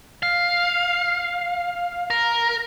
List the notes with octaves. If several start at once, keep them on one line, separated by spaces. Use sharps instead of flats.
F5
A#4